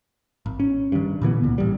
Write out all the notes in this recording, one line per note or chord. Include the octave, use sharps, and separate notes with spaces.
G#1
C#4
G2 D#3
A#2 D3 E3 B3
C#2 A#2
A1 G3